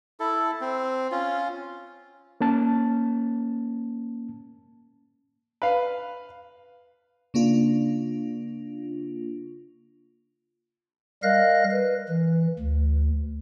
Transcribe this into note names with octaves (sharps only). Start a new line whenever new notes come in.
E4 A4
C4
C#4 F4
A#3 C#4 A5
B4 F5
C#3 A#3 D4 F4
G3 A#4 D#5 F5 F#6 A#6
B4
E3
D2